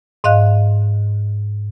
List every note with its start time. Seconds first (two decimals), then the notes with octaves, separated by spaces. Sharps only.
0.24 G#2 D#5 F5 F#6